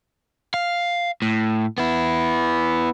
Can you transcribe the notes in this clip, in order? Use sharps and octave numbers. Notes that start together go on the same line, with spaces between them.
F5
A2
B3 E4